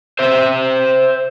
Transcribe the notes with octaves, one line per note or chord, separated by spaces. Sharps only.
C5 E5